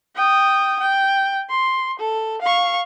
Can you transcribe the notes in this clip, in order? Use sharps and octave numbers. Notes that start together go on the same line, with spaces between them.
G5 D#6
G5
C6
A4
F5 C#6